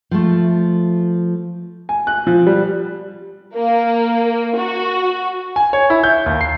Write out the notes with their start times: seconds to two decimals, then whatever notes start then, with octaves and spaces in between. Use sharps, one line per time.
0.11 F3 A3
1.89 G#5
2.07 F#6
2.27 F3
2.47 G3
3.55 A#3
4.57 F#4
5.56 G#5
5.73 C#5
5.90 E4
6.04 G6
6.26 D#2
6.41 C7